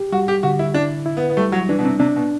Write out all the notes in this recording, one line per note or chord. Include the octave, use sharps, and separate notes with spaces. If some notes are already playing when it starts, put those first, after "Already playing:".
Already playing: G4
G3 F#4
G4
D3 F#4
E4
D4 E4
E4
B3
B3
G3 A3
F#3
E3 D4
B2
C3
C3 D4
B2